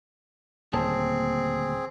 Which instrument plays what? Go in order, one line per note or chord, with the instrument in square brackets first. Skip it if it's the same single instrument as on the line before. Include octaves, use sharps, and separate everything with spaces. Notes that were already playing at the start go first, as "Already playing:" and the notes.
[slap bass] D#1 [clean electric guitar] D2 A#3 A5 [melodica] C4 G#4